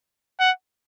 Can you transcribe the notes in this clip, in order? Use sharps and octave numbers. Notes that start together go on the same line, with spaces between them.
F#5